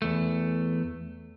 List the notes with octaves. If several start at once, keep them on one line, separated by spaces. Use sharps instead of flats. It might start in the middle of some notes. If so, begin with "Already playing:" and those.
E2 A3